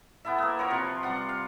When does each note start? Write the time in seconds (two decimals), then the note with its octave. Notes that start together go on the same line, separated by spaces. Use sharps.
0.25 B3 E4 A4 E5
0.38 A#3 B3
0.59 F3 A#4 C#5
0.70 C3 F4 B4 C#6
1.03 C3 G3 F4 F#5
1.29 F5